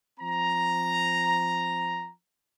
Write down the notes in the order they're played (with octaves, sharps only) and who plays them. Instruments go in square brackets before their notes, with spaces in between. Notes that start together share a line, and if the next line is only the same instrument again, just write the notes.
[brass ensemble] F3 C4 A#5